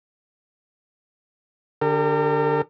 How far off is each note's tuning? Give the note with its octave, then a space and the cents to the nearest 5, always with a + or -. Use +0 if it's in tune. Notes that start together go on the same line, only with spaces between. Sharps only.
D3 +0 G4 +25 A#4 -40